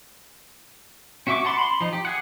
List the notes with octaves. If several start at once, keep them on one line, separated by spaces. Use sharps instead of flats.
C#4 F#4 E5 C#6 D6
F#5 A5 B5 C6 D6
B5 C6
F3 D#4
G4
G#4 F#5